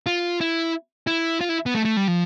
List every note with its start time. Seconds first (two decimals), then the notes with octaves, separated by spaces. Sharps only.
0.06 F4
0.41 E4
1.07 E4
1.41 F4
1.49 E4
1.66 B3
1.75 A3
1.85 A3
1.97 G3
2.08 F3